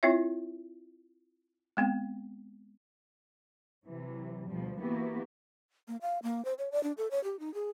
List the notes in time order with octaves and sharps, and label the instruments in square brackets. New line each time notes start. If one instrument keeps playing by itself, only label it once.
[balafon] C4 E4 F4 C#5 E5
G#3 B3 C4
[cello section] C3 E3 F#3
D2 B2 F3 G3
E3 A#3 B3 E4 F#4 G4
[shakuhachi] A#3
F5
A#3
C5
C#5
D5
D4
A4
C#5
G4
D#4
G#4